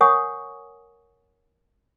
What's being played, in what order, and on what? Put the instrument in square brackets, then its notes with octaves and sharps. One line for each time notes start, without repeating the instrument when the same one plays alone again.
[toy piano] A#4 C#5 F#5 G#5 C#6 D#6